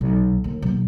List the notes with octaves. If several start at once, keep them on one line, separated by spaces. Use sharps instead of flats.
B1
D#2
B1